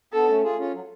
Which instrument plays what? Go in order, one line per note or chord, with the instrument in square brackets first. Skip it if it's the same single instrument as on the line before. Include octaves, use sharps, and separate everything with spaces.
[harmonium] B3 D4 [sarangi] A4
[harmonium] A3 C#4
F4 G#4
C#4 F4
F#3